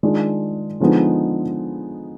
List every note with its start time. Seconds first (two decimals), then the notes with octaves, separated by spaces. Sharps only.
0.03 D#3 G#3 D4 F4
0.80 D3 F3 G#3 B3 D#4